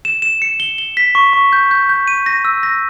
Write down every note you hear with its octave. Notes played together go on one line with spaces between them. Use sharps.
E7
E7
C#7
G7
G7
B6
C#6
C#6
G6
G6
G6
D#7
A#6
E6
A#6